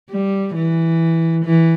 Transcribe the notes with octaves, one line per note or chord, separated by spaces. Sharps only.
G3
E3
E3